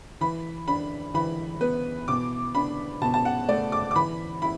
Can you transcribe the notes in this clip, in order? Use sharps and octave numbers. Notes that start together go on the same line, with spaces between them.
E3 B5
D4 B5
E3 B5
B3 B4
B2 D6
D4 B5
B2 A5
A5
F#5
A3 D5
D6
D6
E3 B5
E4 B5